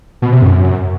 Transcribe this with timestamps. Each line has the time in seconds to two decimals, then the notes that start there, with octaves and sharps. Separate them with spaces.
0.22 B2
0.32 C3
0.42 F#2